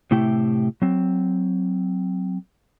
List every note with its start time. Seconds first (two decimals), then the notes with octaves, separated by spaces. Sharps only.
0.11 A2 C3 A3 E4 G4 G5
0.82 F#3 C4